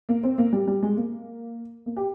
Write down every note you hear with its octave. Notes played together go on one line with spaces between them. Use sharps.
A#3
C4
A#3
G3
G3
G#3
A#3
A#3
G4